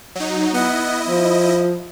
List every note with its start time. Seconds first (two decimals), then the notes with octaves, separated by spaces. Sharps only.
0.15 F#3 D#4
0.54 B3 E4 D#5
1.08 F3